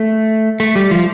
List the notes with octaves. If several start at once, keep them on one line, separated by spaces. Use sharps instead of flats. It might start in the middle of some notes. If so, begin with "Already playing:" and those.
Already playing: A3
A3
G3
F3